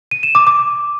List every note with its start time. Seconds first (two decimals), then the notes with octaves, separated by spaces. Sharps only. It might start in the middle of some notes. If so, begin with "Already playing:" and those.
0.11 D#7
0.23 E7
0.35 D6
0.47 D6